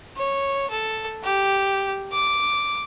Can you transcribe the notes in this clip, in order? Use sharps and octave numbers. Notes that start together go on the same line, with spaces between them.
C#5
A4
G4
D6